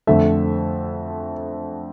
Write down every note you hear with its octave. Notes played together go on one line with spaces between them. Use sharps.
F2 D3 A3 E5